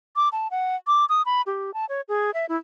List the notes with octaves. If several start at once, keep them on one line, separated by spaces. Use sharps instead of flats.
D6
A5
F#5
D6
D#6
B5
G4
A5
C#5
G#4
E5
E4